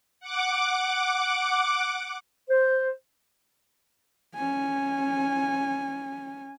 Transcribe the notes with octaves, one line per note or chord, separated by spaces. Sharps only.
F#5 D6
C5
C#4 G#5